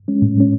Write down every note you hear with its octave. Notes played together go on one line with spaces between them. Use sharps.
G#3 C#4
A2
G#3 C#4